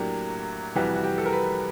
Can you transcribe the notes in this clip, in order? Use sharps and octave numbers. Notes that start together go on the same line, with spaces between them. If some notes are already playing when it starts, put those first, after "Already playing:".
Already playing: A2 F#3 A#3 D4 G4
F2 C3 E3 G3 F#4
F#4
G4
A4
A#4
B4